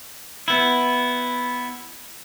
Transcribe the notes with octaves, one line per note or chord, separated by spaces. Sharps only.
B3 E4